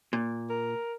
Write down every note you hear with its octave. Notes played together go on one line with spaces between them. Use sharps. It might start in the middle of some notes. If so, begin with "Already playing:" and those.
A#2
A#4